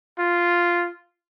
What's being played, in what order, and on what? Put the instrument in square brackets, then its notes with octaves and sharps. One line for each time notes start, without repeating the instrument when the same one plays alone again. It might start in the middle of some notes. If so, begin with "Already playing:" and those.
[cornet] F4